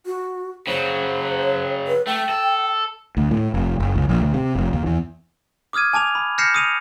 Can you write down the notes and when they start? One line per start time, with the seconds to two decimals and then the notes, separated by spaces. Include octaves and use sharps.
0.06 F#4
0.67 C#3 F#3 C5
1.88 B4
2.07 A3 G5
2.29 A4
3.17 D2
3.31 A2
3.54 F1
3.80 F#1
3.96 C#2
4.09 A#1
4.21 D2
4.34 C3
4.55 F1
4.73 D#2
4.86 E2
5.73 D6 D#6 F6 G#6 D#7
5.93 G#5 A5 D6 F7
6.15 B5
6.38 F6 G6 A#6 C7 C#7 E7
6.54 D#6 D#7 F7